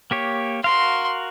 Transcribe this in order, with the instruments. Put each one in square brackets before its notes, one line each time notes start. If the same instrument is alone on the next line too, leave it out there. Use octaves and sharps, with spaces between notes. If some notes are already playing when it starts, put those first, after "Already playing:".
[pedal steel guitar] A#3 G4 C#5
[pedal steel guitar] F#4 A#4 F5 [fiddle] C6